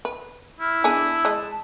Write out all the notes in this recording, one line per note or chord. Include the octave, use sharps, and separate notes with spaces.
B4
E4 F6
B3 D4 G#4 G#5
G#3 D#5 A5